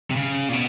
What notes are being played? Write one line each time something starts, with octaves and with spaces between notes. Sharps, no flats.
C3
C#3
A#2
B2